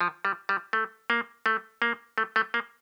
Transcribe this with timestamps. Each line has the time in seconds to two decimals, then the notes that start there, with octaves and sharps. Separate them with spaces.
0.01 F3
0.25 G3
0.49 G3
0.73 A3
1.10 A#3
1.46 A3
1.82 A#3
2.18 A3
2.36 A3
2.54 A#3